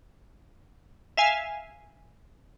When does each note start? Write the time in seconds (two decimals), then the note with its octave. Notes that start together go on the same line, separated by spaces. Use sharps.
1.17 E5 F5 G#5